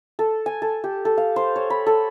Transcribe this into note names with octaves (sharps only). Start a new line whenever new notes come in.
A4
G#5
A4
G4
A4
F5
C5
C#5
B5
A4